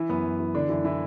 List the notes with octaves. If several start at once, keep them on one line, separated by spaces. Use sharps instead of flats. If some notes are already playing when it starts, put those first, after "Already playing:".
Already playing: E3 E4
F#2 B3
F#2
E3
D3 D4
F#2 E3 E4
E3 E4